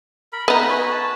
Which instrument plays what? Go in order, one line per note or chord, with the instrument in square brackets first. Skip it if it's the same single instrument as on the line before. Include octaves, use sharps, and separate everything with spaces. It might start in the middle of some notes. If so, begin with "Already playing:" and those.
[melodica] A#4 B5
[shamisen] B3 D#4 [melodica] B4
[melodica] F#4 G#5 B5
A5